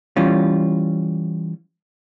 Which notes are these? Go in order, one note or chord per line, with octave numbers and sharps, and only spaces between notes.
E3 G3 C#4 F4